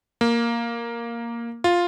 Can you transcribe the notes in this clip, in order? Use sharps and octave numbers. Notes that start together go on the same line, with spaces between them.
A#3
F4